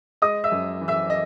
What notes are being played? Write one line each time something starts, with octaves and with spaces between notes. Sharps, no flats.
G#3 D#5 D#6
E5 E6
F#2
E3
E5 E6
D#5